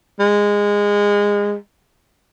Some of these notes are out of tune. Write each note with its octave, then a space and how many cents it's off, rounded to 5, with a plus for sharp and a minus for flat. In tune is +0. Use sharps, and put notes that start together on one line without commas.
G#3 -20